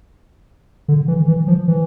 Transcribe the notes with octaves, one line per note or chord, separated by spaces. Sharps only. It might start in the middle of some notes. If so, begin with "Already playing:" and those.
D3
E3
E3
F3
E3